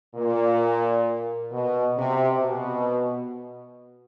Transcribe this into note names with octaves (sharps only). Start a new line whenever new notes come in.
A#2
B2
C3
B2